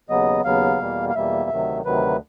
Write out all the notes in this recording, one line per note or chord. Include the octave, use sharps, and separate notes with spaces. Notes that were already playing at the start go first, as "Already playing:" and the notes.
D#2 C#3 F#3 B3 D#5
D#2 C#3 F#3 B3 F5
E2 B2 G3 A#3
F5
E2 B2 G3 A#3 E5
D2 C3 D#3 F#3
D2 C3 D#3 F#3 B4